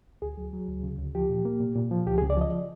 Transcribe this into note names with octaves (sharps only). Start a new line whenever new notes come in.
D2 G#4
F#3
F#3
D2
C#3
D2
F3 G4
A#2
A#3
A#2
A#2
F3
C#2 G4
G#4
C#2
D5
F3 D#5